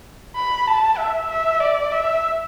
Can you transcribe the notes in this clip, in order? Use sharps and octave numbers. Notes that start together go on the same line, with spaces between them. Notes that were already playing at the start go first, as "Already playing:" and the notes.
B5
A5
E5
E5
D5
E5